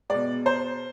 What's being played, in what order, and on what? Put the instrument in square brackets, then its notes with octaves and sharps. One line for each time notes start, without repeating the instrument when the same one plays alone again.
[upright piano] B2 G#3 D5
C5